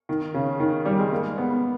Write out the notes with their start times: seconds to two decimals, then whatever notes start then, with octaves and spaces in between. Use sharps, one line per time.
0.09 D#3
0.34 C#3
0.60 D#3
0.85 G3
0.99 G#3
1.11 A#3
1.38 B3